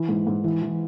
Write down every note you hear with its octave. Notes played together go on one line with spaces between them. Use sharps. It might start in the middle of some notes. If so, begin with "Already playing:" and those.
Already playing: E3
G#2
G#2
E3
E3